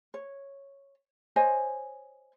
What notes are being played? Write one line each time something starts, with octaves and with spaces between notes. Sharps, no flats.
C#5
C5 C#5 D#5 G#5